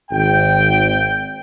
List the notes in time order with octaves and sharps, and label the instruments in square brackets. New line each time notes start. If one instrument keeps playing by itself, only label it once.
[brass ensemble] G#1 G5